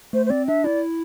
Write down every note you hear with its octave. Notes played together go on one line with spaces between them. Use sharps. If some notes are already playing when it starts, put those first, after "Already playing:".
A3 C5
C5
C4 D5
D4 E5
E4 D5